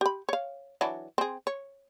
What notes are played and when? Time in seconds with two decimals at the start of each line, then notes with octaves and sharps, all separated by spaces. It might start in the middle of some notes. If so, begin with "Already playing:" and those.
0.01 G4 B5
0.29 C#5 F5
0.81 E3 F#3 D4
1.18 C4 G#4
1.47 C#5